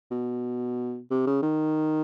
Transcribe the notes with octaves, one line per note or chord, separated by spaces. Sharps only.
B2
C3
C#3
D#3